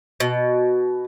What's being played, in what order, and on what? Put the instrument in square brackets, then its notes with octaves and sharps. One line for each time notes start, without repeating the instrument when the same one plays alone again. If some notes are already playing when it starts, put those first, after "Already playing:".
[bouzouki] B2